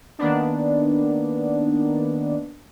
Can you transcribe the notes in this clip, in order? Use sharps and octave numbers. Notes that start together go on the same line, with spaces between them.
D#3 A#3 B3 D4